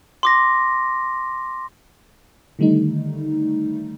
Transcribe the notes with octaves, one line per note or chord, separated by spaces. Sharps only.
C6 D6 A#6
D3 D#3 G3 A3 D#4